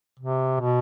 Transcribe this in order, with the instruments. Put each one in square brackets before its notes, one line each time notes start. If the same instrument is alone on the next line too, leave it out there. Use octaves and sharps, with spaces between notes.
[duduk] C3
B2